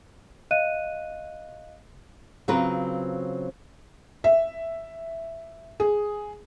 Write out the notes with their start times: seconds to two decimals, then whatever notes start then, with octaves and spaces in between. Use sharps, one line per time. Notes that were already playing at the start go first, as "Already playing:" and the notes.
0.51 D#5 F5 F#6 D#7
2.48 C#3 F#3 C4 F4 A#4 B4
4.24 E5
5.80 G#4